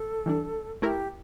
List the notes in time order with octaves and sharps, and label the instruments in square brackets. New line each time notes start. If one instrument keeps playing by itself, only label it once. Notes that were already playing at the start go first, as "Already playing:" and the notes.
Already playing: [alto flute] A4
[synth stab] E3 G3 D4
[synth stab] A3 E4 A#4 [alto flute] G4